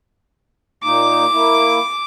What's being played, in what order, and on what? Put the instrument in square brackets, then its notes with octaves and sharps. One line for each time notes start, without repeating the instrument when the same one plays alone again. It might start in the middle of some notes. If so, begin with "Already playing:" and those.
[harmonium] A#2 A#3 D#4 [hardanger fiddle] D6
[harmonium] A#3 E4